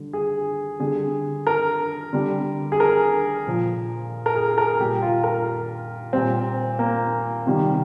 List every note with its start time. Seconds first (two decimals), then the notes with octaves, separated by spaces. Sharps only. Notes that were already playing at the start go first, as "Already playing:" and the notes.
Already playing: D3 G3
0.13 G#4
0.80 D3 G3 G#4
1.47 A#4
2.13 D3 G3
2.72 G#4
2.80 A#4
3.47 A#2 F3
4.26 A#4
4.35 G#4
4.58 A#4
4.79 A#2 G3 G4
5.02 F4
5.24 A#4
6.13 A#2 G3 C4
6.79 A#3
7.46 C3 D#3 G3